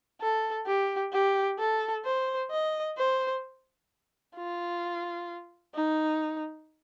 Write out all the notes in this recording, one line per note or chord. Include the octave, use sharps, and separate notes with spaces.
A4
G4
G4
A4
C5
D#5
C5
F4
D#4